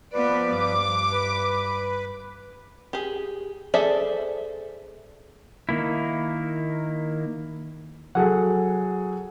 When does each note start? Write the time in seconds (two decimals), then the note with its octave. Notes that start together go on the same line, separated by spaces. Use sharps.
0.13 F3 B3 B4 D5
0.55 G2 D6
1.13 B4
2.93 G4 G#4
3.74 G#4 A4 C5 D5 E5
5.69 D#3 A#3 E4
8.15 F#3 G#4 A4 F#5